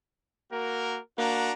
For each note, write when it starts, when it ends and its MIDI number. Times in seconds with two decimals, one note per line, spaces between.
0.53 0.99 58
0.53 0.99 66
0.53 0.99 70
1.18 1.51 58
1.18 1.52 62
1.18 1.52 66
1.18 1.52 82